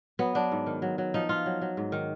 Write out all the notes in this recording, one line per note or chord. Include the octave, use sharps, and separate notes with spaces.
F#3 B3
F#3 D4
G#2
D#3
F#3
F#3
F3 D#4
F3 F4
F#3
F#3
G#2
D#3